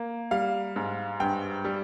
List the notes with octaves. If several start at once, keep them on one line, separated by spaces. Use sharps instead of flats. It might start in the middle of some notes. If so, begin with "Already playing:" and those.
Already playing: A#3
G3 F5
G#2
G2 G5
G3